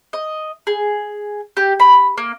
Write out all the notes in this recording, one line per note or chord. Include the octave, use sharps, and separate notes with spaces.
D#5
G#4
G4
B5
A#3